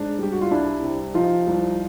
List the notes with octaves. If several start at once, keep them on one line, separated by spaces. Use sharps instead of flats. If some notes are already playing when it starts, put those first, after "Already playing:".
Already playing: G#2 D4
G3 G4
F#4
F4
C2 D4 E4
C3
F3 D#4 F4
C2